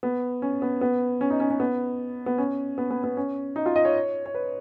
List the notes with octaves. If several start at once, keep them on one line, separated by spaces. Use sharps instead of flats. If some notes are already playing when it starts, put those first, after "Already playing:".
B3
C#4
B3
B3
C#4
D#4
C#4
C#4
B3
B3
C#4
B3
B3
B3
C#4
D#4
F4
D#5
C#5
C#5
B4